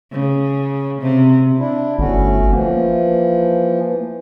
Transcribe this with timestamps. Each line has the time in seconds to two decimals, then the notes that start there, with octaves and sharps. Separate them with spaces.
0.12 C#3
1.02 C3
1.56 D4 E4
1.99 G1 A3 C#4 F#4
2.53 E3 F3 A#3